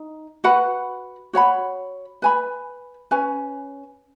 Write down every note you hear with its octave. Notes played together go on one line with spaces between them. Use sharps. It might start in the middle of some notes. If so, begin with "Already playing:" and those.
Already playing: D#4
F#4 B4 F#5 B5
F#4 C#5 F#5 B5
B4 G#5 B5
C#4 B4 G#5